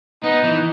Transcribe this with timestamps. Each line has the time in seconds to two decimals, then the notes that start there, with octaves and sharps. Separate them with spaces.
0.24 B3 D#4
0.44 E3